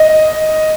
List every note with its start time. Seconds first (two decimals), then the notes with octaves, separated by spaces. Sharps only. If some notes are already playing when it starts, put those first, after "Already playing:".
Already playing: D#5